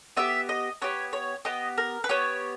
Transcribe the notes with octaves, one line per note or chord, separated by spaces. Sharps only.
B3 G4 E5
D#5
B3 G4 C#5
C#5
B3 G4 D#5
A#4
B4
B3 G4 C#5